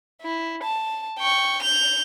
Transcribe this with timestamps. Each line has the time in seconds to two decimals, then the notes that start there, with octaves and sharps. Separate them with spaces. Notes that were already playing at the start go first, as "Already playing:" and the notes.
0.22 E4
0.63 A5
1.18 G5 C#6
1.63 G6 F7